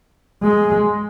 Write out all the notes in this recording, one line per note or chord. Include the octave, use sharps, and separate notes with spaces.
G#3